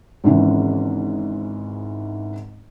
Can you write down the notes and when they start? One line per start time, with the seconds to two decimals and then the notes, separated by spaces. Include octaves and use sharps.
0.24 G#1 G#2 C#3 E3